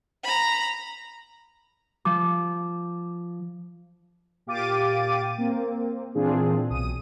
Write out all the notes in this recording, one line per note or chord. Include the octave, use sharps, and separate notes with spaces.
A#5 B5
F3 D6
A#2 G4 F5 D6 A6 D#7
A#3 C4
A#2 E3 C4 D4 F4 G#4
B1 D#6 D#7